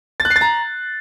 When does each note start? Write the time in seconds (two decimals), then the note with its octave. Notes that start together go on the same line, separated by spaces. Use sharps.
0.20 A6
0.25 F#6
0.30 C7
0.36 A6
0.41 A#5